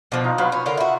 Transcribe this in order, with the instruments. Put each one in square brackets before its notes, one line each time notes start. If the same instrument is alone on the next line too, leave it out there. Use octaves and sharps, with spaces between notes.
[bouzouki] B2 F3 [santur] D4
[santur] D#4 F4
[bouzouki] F#3 [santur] B4 F5 B5
[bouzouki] C#4
D3 F4 A#4
E4 F#4